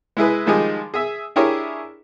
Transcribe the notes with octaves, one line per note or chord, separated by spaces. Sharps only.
G#3 E4 G#4 B4
D#3 F3 G3 G#3 D#4 G#4
G#4 E5
D4 E4 G4 G#4 A#4 C#5